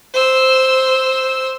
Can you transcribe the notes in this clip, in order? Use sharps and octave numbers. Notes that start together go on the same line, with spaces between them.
C5 E6